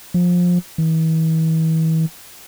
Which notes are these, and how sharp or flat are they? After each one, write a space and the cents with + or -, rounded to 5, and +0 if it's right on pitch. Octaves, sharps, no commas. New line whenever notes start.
F3 +20
E3 -40